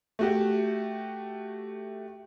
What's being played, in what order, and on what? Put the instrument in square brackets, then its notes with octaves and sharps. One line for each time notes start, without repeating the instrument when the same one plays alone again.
[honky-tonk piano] A3 F#4 G4